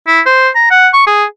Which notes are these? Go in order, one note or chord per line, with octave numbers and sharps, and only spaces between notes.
E4
C5
A#5
F#5
C#6
G#4